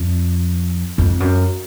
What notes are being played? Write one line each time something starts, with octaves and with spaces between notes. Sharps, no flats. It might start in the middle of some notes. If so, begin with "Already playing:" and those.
Already playing: F2
F2
F#2